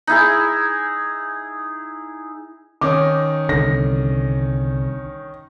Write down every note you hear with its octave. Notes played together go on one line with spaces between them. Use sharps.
D#4 E4 G#4
D#3 C#4 D#4 D6
C2 D3 A#6